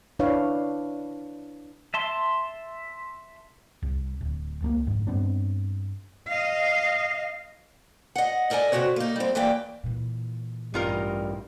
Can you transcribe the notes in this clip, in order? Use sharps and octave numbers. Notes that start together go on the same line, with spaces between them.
D4 E4 B4 C#5 F5
E5 A5 C6
C2
D1
C#2 A3 A#3
F1 G#2
G2 B3 C4 D4
D#5 F5
D#5 F#5
A4 A#4 D5 D#5 G#5
G2 C3 F#3 C#4 F#4 C#5
A#3 D#4
G3 C4
D#2 E3 A#3 D5 G5
A#2 E3
A1 G2 G3 D#4 F4 A#4